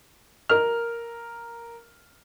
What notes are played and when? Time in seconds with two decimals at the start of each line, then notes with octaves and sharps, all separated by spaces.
0.49 A#4 F6